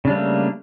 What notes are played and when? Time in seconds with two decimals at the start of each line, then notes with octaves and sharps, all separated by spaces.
0.05 C#3
0.07 D4
0.10 G3
0.13 A3
0.15 A#3